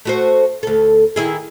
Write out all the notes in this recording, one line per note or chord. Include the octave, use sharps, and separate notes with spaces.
A3 F#4 C5
D2 A4
D#3 E4 G#4